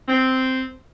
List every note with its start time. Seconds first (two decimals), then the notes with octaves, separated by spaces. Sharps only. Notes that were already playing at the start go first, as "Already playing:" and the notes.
0.08 C4